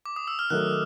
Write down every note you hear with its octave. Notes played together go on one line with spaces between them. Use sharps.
D6
D#6
E6
F6
D#3 F#3 A3 F#6